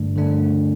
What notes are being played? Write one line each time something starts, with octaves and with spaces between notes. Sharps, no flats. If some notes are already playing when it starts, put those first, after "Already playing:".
Already playing: G2 D3 A3 D4
G2 D3 A3 D4